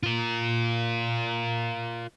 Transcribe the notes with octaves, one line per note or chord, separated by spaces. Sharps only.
F4 A#4